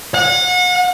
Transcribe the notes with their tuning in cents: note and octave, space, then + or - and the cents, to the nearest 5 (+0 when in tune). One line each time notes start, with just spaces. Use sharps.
F#5 -35